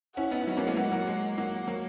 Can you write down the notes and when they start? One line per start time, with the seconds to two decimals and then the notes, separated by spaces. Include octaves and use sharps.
0.17 C#4 E4 F#5
0.31 B3 D#4
0.47 F#3
0.57 A#3 C#4
0.67 G#3 B3
0.77 F#3 A#3 F#5
0.92 F#3 A#3
1.07 G#3
1.38 F#3 A#3 F#5
1.67 F#3 A#3